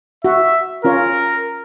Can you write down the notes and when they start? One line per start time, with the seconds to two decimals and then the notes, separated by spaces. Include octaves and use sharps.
0.25 F#4 E5
0.85 C#4 F4 A#4 C#5